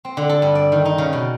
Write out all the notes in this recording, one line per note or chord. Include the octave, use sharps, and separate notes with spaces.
C4
D3
A4
G2
D5
D#3
D#4
C#3
B2